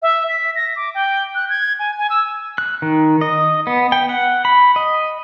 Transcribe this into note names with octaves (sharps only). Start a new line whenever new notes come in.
E5
B6
A#6
D6
G5
F#6
G#6
G#5
G#5
E6
F#6
D#3
D#5
B3
G5
F#5
B5
D#5